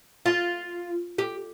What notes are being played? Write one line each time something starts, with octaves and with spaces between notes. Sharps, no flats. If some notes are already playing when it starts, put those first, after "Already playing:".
F4
G4